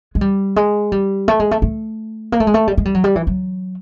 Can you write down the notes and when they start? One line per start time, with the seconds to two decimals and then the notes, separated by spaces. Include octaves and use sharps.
0.15 G#3
0.21 G3
0.56 G#3
0.92 G3
1.28 A3
1.40 G#3
1.51 A3
1.62 A3
2.32 A#3
2.40 A3
2.47 G#3
2.54 A3
2.67 G3
2.77 G#3
2.85 G3
2.95 F#3
3.04 G3
3.16 E3
3.27 F#3